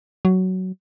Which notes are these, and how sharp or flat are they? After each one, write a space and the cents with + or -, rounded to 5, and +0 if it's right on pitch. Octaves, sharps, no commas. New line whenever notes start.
F#3 +10